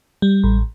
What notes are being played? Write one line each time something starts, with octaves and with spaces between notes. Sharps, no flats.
G3
A1